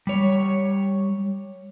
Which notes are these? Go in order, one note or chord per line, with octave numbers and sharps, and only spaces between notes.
G3 C#5